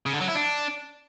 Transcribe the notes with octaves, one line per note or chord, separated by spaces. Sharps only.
C#3
D3
F#3
E4
D4